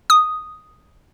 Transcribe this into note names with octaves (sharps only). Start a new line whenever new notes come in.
D#6